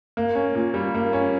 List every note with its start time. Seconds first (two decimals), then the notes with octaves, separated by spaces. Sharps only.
0.17 A#3
0.35 C#4
0.55 A#2
0.74 G3
0.95 A#3
1.13 C#4